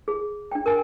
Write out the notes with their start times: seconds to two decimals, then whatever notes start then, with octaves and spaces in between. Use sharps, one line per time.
0.08 G#4
0.52 D4 G5
0.66 A#4 G5 G#5